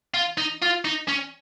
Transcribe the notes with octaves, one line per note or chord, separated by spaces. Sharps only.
F4
D#4
F4
D#4
C#4